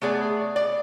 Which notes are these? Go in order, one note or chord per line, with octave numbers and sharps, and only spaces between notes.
A3 B3 G#4 D5
D5